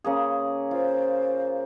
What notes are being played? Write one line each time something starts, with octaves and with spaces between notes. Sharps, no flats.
C#3 A#3 G#4
F4 C5